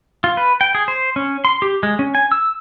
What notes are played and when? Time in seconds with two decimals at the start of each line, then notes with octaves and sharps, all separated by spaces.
0.24 F4
0.37 B4
0.61 G5
0.75 G#4
0.88 C5
1.16 C#4
1.45 C6
1.62 G4
1.83 G#3
1.99 C#4
2.15 G#5
2.32 E6